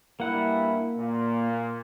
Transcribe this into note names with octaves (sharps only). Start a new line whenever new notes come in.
G2 A#3 E4 F#5
A#2